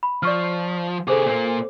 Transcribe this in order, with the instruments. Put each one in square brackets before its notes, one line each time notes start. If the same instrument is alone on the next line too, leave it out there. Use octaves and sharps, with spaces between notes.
[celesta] B5
[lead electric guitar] F3 [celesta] D5 C#6 F6
[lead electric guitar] C3 G#4 [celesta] A4 C5 D6
[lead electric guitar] A#2 A#3